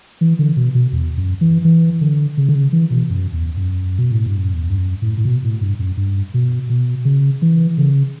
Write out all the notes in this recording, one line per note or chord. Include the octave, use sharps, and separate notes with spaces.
E3
D3
B2
B2
E2
F#2
E3
E3
D3
C#3
D3
C#3
E3
B2
F#2
E2
F#2
B2
A2
G2
F#2
E2
G2
F#2
A2
A2
B2
A2
G2
F#2
G2
B2
B2
C#3
E3
C#3